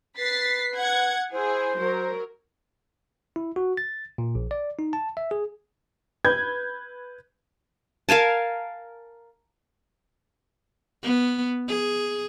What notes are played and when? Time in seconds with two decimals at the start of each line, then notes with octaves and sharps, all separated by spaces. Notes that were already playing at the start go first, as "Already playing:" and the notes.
0.18 B4 A6 B6 C7
0.75 F#5 G#6
1.32 E4 G#4 C5
1.78 F#3 A#4
3.36 E4
3.56 F#4
3.77 A6
4.18 A#2
4.35 A#1
4.51 D5
4.79 D#4
4.93 A5
5.17 E5
5.31 G#4
6.25 B4 G6 G#6
8.09 A#4 F5 G#5 A5
11.03 B3
11.69 G#4